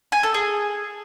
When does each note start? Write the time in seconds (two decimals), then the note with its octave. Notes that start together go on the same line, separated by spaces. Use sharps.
0.12 G#5
0.23 A4
0.34 G#4